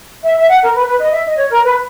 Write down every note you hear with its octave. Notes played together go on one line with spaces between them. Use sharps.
E5
E5
F#5
A#4
B4
B4
D#5
E5
D#5
C#5
A#4
B4